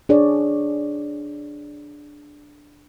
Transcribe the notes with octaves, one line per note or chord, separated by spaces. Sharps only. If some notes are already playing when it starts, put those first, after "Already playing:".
D4 G#4 C#5 D5